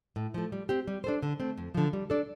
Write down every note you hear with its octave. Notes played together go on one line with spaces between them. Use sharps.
A2
F3 A3
G3
C4 G4
G3
D4 A4 C5
D3
A3 C4
F2
D3 F3
G3
D4 A4 D5